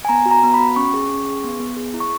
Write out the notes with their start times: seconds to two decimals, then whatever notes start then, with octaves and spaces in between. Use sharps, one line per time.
0.05 G#5
0.09 B3 A#5
0.26 F#4
0.31 A#5
0.43 B3
0.54 B5
0.60 F#4
0.76 C#4 C#6
0.94 G#4
1.10 C#4
1.27 G#4
1.44 B3
1.60 B3
1.77 G#4
1.94 E4
2.00 C#6